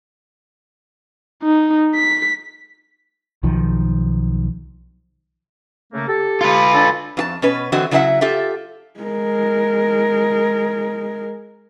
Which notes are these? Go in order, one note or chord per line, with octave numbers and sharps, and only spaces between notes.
D#4
B6
B1 D#3 F3
C#3 A3 A#3
G4 A4
F4 B4
D4 A4
F2 F4 A5
B2 C#4 B4
D3 E3 F#3 C4 F#4 D#5
C#3 F#3 E4 G4 E5 F#5
F4 G4 A4 E5
G#3 A#4